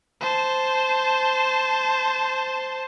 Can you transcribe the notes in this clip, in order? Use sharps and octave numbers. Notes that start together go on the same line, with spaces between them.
C5 A5